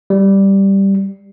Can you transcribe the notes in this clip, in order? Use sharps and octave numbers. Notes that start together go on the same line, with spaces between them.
G3